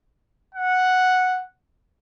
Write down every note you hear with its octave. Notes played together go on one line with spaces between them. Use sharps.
F#5